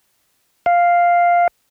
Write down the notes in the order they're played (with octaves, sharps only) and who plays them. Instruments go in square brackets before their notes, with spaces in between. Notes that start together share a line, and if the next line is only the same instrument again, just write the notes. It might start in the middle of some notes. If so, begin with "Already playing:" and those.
[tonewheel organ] F5